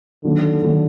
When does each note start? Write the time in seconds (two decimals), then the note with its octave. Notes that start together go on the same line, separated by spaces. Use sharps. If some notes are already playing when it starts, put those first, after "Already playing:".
0.24 D3 D#3 F#3 A#3 D4 A4
0.62 D#3 F#3 A#3 D4 A4